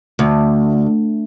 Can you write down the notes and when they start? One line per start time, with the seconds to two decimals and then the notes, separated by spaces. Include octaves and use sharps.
0.19 D2